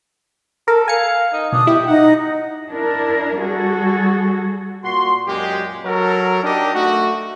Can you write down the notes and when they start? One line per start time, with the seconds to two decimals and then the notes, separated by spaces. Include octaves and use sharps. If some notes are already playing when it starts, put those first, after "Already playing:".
0.68 A4 A#4
0.88 F5 G#5 C#7
1.33 D#4
1.52 B2 D4 D#6
1.67 E4 G4
1.87 D#4 F#5
2.71 D4 E4 A#4
3.39 G3 F#4 G#4 A4
4.84 A#2 F#4 C6
5.27 F#2 A#2 G#3 G4
5.85 F#3 F#4 A4 A#4
6.44 D4 D#4 G4 A#4 D#5
6.75 A3 F#4